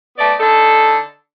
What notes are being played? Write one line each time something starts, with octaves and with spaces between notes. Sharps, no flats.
A3 B3 D5
D3 D#4 A4